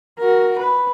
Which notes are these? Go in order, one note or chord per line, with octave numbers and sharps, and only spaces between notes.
F#4 A#4
B4